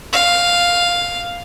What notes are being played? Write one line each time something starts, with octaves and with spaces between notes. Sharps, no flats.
F5